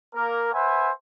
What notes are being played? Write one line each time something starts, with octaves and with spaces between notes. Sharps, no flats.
A#3 A#4
B4 C5 E5 F#5 G#5